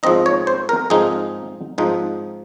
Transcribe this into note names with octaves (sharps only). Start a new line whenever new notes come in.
G#2 F3 C4 D#4 D#5
C#5
C5
A#4
G#2 F3 C4 D#4 G#4
G#2 F3 C4 D#4